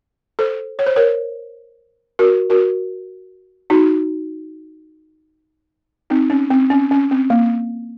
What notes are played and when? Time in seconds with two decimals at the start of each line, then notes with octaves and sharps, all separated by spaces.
0.39 A4 C5
0.79 C#5
0.86 C5
0.96 A#4 C#5
2.19 F#4 A#4
2.50 F#4 A#4
3.70 D#4 F#4
6.10 C4 D#4
6.30 C#4
6.50 C4
6.70 C#4
6.91 C#4
7.11 C4
7.30 A#3